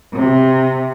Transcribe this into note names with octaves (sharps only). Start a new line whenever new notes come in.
C3